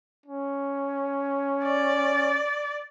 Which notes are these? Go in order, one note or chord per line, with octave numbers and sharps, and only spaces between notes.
C#4
D5